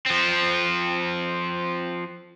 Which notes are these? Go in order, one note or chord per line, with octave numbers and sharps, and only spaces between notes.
F3 C4